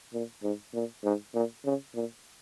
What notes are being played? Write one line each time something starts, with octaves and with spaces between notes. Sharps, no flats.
A#2
G#2
A#2
G#2
A#2
C#3
A#2